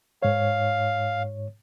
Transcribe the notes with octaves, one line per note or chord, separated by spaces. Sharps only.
G#2 C#5 F5